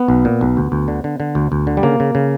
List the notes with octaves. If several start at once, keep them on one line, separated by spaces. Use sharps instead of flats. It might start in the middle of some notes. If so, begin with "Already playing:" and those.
Already playing: B3
B1
A#2
B1
D2
D2
D3
D3
D3
D2
D2
D3
G3
C#3 A#3
C#3
C#3